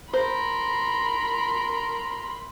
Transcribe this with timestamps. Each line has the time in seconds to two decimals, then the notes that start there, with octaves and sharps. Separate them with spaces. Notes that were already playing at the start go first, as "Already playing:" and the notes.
0.13 A#4 C5 B5 C6